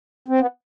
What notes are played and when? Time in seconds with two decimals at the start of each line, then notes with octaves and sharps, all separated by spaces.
0.28 C4
0.40 B3